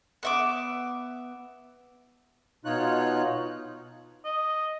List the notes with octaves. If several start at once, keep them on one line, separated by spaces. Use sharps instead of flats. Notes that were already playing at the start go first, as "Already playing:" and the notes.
B3 E5 D6
B2 D#4 F4 C#5 F#6
D#5